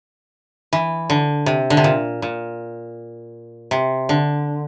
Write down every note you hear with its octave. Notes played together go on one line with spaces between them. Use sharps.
E3
D3
C3
D3
C3
A#2
A#2
C3
D3